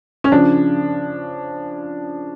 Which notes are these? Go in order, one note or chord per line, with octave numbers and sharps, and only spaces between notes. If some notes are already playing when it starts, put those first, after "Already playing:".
C#4
C#3 F3 D4